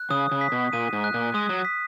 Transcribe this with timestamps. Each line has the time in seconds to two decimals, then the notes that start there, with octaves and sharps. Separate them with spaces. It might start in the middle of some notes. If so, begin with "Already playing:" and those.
Already playing: F#6
0.10 C#3 D#6
0.31 C#3
0.41 B6
0.52 B2
0.73 A#2 D#7
0.93 G#2
1.04 F#6
1.14 A#2
1.34 G#3 D#6
1.49 F#3
1.65 B6